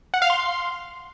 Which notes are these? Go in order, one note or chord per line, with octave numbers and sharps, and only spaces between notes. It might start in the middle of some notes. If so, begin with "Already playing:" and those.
F#5
F5
C6